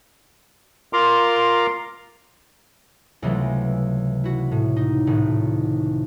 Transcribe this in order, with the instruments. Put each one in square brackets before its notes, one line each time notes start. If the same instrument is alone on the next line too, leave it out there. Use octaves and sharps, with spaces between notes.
[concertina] F4 A#4 A#5 C6 D6
[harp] C#2 C3 E3 F#3 G#3 A3
E4 F#4
A2
D#4
G#1 A2